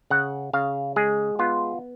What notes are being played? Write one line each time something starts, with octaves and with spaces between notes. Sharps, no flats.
C#3 F#5
C#3 F5
G#3 G#4
B3 F4